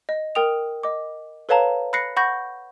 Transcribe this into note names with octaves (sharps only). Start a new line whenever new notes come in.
D#5
A#4 G5 D#6 F7
D#5 D6
A4 B4 C#5 F5 A5 A#5
B5 F#6 A#6 C7 C#7
F#5 B5 C#6 G6 A#6